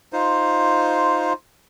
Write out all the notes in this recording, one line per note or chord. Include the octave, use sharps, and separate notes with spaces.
D#4 F4 C5